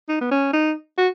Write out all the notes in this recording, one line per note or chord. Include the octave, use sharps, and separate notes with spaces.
D#4
B3
C#4
D#4
F#4